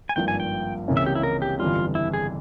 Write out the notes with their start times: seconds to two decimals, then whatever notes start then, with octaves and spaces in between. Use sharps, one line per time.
0.09 G#5
0.16 G#1 G2 F3 A#3 F4 G5
0.28 G#5
0.40 G5
0.88 C#2 C3 E3 A#3 C#4
0.97 E5
1.06 G4
1.15 E4
1.23 A#4
1.42 G4
1.59 G1 F2 E3 G3 F4
1.95 E4
2.14 G#4